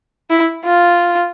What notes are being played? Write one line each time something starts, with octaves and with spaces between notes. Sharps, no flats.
E4
F4